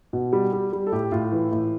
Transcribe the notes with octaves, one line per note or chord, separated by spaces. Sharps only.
B2
G3
G3
G3
A4
A2 G4
A2 F4
E3
A2